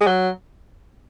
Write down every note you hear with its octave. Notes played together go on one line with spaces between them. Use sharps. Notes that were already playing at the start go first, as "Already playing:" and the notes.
G#3
F#3